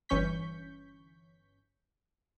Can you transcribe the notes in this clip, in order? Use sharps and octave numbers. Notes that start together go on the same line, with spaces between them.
G1 E3 C#4 C#6 G6 B6